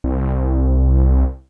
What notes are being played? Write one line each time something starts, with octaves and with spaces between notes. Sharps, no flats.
C2